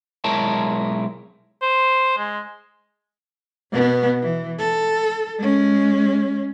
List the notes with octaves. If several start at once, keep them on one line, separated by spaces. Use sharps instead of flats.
B1 G#3 E4 A#4 C#5 A5
C5
G#3
B2 B3
E3
A4
G#3 C#4